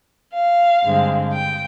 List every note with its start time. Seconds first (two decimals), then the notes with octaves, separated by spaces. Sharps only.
0.33 F5
0.83 G2 D3 G#3 C4
1.32 G5